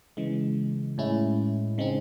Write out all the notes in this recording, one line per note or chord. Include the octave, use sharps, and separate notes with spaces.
C#3 E3 G#3
A2 G#3 C#4 E4
C#3 G#3 C4 D#4